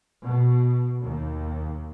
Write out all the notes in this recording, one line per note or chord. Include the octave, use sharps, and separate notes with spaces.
B2
D#2